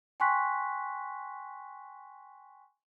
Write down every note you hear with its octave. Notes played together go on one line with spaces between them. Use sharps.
G5 G#5 C6 C#6 F#6 B6